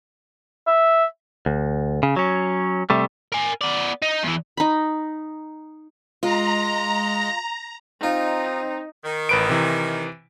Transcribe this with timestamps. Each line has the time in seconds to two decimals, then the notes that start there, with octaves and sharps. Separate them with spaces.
0.67 E5
1.46 D2
2.03 C#3
2.16 F#3 C#4
2.90 C3 G3 A3
3.32 A#4 G#5
3.61 B3 D5
4.02 D#4
4.23 E2 E3
4.57 D#4 B5
6.23 G#3 F4 D#5 A#5
8.03 C4 D#4 F4
9.04 D#3
9.29 A1 B4 D7
9.49 C3 E3